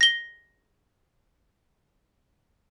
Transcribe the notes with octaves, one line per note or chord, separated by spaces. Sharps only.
A#6 G7